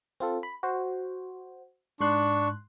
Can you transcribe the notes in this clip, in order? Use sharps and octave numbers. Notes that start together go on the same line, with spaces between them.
C4 F4 A4
B5
F#4 C5
G#2 D4 C6 C#6 F#6